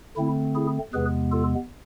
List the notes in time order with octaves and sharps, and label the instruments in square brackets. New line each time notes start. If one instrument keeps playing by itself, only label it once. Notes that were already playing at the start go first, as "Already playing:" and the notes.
[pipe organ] D3 A3 C4 E4
E4 G#4
E2 C3 G#3 B3 G#4 B4
F4 A4